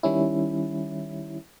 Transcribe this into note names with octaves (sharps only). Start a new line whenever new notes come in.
D#3 G3 C#4 E4